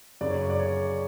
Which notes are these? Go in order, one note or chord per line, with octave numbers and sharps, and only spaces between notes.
F#2 C#3 D5
C#5
D5
C#5